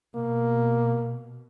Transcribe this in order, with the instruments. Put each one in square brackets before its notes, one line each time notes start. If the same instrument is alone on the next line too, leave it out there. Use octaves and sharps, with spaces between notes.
[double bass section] B2 [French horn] A#3